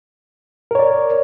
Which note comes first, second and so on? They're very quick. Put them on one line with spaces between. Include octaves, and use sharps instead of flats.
A#4 C#5 D5